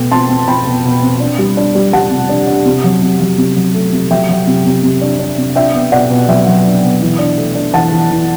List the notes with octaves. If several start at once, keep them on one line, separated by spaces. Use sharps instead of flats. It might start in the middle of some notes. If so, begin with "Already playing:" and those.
Already playing: B2 A3 G5
C4 A5 C6
C4
C4 G5 B5
B2
B2
C4
D4
G3
D4
G3
G3 F#5 A5
C3
D4
D4
C3
F#3
C3
F#3
C3
F#3
A3
C3
F#3 E5 G5
F#3
C3
C3
C3
D4
D4
C3
D4 E5 G5
B3
B2 D5 F#5
B2
F#3 E5 G5
F#3
D4
B2
E3
D4
A3
D4
E3 F#5 A5
E3
E3